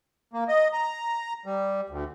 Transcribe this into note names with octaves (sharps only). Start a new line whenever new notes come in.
A#3
D#5
A#5
G3
D2